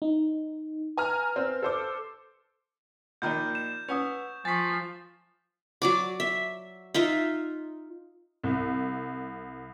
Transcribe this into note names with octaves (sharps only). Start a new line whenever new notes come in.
D#4
B4 G#5 A#5 F6
C4
A4 C5 D6
A#1 D#3 A#3 D5 G6
E7
C#4 B4 F#5 D#6
F3 G#5 C#6 A6 B6
F#3 D5 D6
E5
D#4 F4 E5
C2